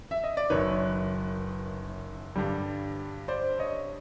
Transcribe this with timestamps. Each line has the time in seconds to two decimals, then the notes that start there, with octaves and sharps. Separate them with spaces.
0.11 E5
0.24 D#5
0.37 D5
0.50 F#1 F#2 D#3 B4 C#5
2.36 G2 D3 G3
3.28 C5 D5
3.59 C#5 D#5